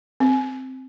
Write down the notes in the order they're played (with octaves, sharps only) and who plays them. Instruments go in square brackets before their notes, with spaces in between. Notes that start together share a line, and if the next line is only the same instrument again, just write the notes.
[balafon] C4